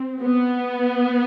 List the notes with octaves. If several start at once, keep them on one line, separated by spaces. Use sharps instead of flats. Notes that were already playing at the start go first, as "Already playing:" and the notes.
Already playing: C4
B3